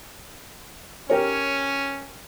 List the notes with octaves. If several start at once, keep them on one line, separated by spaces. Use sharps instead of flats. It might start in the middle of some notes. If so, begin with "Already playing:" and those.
C#4 G4 A#4 C#5